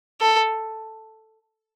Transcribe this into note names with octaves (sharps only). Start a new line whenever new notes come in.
A4